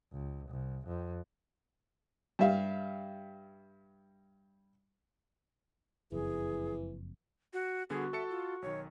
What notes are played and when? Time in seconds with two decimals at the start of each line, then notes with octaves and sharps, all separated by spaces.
0.13 C#2
0.50 C2
0.87 F2
2.39 G2 G3 E5 F5
6.12 F#1 F2 E3 G#4
7.53 F#4
7.90 D3 G3 B3 F#4 G#4
8.13 A4 E5 A5 C#7
8.29 F4
8.62 B1 D#3 C#5